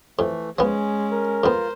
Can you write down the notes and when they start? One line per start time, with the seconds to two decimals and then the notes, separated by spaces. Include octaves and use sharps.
0.19 F2 E3 A3
0.59 F3 G#3 B3 C#4
1.11 A#4
1.44 F2 B3 F4 C5